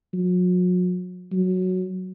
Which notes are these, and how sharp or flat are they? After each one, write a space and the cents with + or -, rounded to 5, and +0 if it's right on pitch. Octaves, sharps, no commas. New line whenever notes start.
F#3 -40
F#3 -5